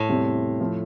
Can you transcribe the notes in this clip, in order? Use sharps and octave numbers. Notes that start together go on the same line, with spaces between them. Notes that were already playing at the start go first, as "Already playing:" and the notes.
Already playing: A2
E2 C3 G3 C4
F3 A3 E4